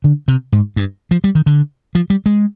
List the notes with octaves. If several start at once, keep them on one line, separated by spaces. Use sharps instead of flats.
D3
C3
G#2
G2
F3
G3
D#3
D3
F3
G3
G#3